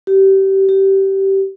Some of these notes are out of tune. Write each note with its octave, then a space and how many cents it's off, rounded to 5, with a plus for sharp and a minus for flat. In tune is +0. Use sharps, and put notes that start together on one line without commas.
G4 -25
G4 -20